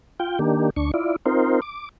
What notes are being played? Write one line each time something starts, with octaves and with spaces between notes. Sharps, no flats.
F4 G5
D#3 A#3 D4 G4
D2 D4 C#6
E4 F4 D5
C4 D#4 F4 A#4 C5
D6